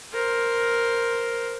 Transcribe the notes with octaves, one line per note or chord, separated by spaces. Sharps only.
A#4 C5